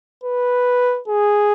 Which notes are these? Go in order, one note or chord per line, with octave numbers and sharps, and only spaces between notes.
B4
G#4